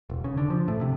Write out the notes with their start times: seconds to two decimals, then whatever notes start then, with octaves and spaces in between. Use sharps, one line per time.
0.10 E1
0.24 C#3
0.37 D3
0.50 F3
0.68 A2
0.81 C3